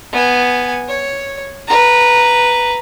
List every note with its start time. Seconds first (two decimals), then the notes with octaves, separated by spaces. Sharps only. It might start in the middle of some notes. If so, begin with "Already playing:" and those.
0.12 B3 G#5
0.88 C#5
1.67 B4 A#5